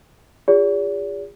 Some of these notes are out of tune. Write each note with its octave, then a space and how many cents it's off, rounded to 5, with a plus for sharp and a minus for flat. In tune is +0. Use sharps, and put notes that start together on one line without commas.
F4 +5 G#4 -40 D5 -45